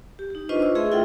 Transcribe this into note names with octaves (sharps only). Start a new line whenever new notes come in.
G4
D#4 G4
D4 F4 B4 C5 D#5 C#6
E6
A3 G#4 E5 C6
E4 F4 A4 F#5 G5